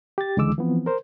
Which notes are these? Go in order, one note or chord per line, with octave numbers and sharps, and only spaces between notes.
G4 A6
C#2 D3 E3 G#3 D6 E6
E3 F3 B3 C4
A#4 C5